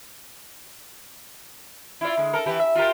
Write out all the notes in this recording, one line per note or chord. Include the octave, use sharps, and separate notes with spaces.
E4 F4 D5
D3 G#3
A4 A#4
E3 G4
E5
F4 G4 A#4